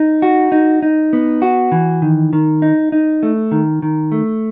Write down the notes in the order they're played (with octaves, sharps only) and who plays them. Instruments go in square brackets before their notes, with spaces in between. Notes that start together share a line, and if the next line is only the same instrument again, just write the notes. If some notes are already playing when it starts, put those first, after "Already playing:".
Already playing: [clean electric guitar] D#4
F#4
D#4
D#4
B3
F#4
E3
D#3
D#3
D#4
D#4
A3
D#3
D#3
A3